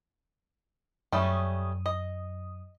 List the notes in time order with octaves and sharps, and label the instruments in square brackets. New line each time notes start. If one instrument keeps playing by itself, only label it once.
[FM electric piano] F#2 D#6 [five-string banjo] G3 A3 C#4
[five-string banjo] D#5